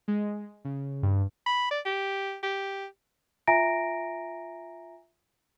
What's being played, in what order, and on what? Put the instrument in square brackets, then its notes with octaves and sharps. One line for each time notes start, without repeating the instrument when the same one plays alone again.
[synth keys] G#3
C#3
G2
[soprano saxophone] B5
D5
G4
G4
[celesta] F4 E5 G#5 A#5 A#6 D7